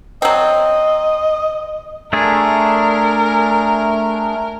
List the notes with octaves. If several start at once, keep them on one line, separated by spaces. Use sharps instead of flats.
F#3 C4 D#5
A3 D4 G#4 A#4